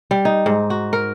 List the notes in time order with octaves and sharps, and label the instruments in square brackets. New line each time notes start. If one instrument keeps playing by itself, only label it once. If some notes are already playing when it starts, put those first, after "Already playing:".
[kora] G3
D#4
G#2
F#4
A#4